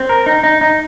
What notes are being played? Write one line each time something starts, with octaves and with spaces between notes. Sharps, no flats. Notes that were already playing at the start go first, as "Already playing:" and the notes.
Already playing: C4
A#4
D#4
D#4
D#4